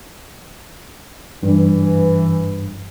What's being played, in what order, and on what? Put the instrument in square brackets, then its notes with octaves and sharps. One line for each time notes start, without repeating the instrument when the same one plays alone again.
[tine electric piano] G2 [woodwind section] E3